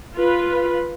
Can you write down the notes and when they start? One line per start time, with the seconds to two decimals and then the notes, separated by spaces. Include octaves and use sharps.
0.15 F4 B4